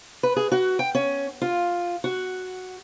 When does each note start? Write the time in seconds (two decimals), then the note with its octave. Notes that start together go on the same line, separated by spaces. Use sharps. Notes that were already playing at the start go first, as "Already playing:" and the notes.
0.23 B4
0.36 G#4
0.52 F#4
0.79 G5
0.95 C#4
1.42 F4
2.04 F#4